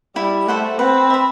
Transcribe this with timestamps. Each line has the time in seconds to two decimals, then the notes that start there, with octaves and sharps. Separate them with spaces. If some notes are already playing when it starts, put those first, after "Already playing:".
0.16 G3 E4
0.48 A3 A4 C5 F#5
0.79 C4 B4
1.10 E5 B5